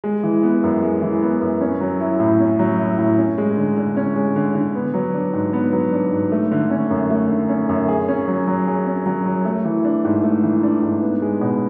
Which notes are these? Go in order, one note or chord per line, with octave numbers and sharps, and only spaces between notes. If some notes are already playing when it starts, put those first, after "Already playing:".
G#3
E3
B3
F#2
G#3
E3
B3
F#2
C#4
F#3
E4
A2
C#4
F#3
E4
A2
C#4
G#3
D3
D3
C#4
G#3
D3
D3
B3
F#3
D4
G#2
B3
F#3
D4
G#2
A3
D3
C#4
F#2
A3
D3
C#4
F#2
G#4
C#4
F#3
F#3
G#4
C#4
F#3
F#3
A3
E3
D4
G#2
A3
E3
D4
G#2
B3
G#3
B2